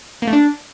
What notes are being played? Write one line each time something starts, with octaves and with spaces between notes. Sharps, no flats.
A#3
A3
D4